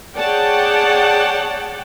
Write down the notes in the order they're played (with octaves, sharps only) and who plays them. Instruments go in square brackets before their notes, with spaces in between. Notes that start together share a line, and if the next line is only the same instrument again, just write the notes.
[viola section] G#4 C#5 D5 F#5 G5 A5